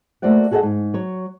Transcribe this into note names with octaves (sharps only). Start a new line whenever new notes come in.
A3 A#3 F#4 C5 D5 F#5
F#4 G#4 A4 D5 D#5 F#5
G#2
F#3 C#5